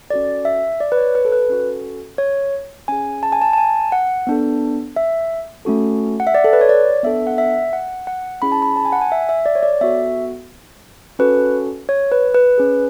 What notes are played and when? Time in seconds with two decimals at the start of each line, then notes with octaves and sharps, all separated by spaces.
0.10 C#4 F#4 A4 D5
0.45 E5
0.80 D5
0.92 B4
0.97 C#5
1.15 B4
1.25 A4
1.32 B4
1.49 C#4 F#4 A4
2.18 C#5
2.88 C#4 G#4 G#5
3.23 A5
3.32 G#5
3.42 A5
3.53 A5
3.58 G#5
3.92 F#5
4.27 B3 D4 A4
4.96 E5
5.65 A3 C#4 F#4 A4
6.20 F#5
6.27 E5
6.35 D5
6.44 A4
6.53 B4
6.61 C#5
6.69 D5
7.03 B3 D4 A4 E5
7.27 F#5
7.38 E5
7.73 F#5
8.07 F#5
8.42 C#4 E4 G#4 B5
8.52 A5
8.62 B5
8.76 A5
8.85 G#5
8.92 F#5
9.01 G#5
9.12 E5
9.29 E5
9.46 D5
9.55 C#5
9.63 D5
9.81 B3 F#4 A4 E5
11.19 C#4 F#4 A4 B4
11.89 C#5
12.12 B4
12.34 B4
12.58 C#4 G#4